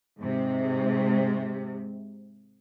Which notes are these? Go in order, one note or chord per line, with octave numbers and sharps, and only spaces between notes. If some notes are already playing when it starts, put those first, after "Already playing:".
G#2 C3